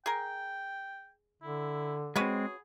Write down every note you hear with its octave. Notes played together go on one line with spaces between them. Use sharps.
G#4 A#4 G5
D3 E4
G#3 C4 C#4 F#4 G#4 B4